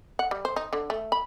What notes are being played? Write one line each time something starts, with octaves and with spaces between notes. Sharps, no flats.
F#5
G3
C5
D#4
D3
A3
B5